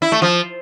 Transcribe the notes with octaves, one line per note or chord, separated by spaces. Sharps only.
E4
A3
F3